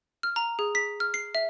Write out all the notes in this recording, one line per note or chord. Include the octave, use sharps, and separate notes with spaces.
F6
A#5
G#4
B6
F6
C7
E5